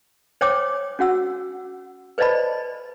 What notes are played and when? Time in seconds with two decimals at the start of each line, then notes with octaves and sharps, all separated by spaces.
0.41 C5 C#5 G5 D6 D#6
0.99 C#4 F#4 F#5 E6
2.18 B4 C5 D5 D#5 A5 B5